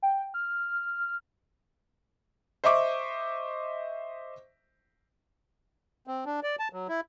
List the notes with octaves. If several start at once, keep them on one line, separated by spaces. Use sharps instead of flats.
G5
F6
C5 D#5 E5 C#6 D6
C4
D4
D5
A5
F#3
E4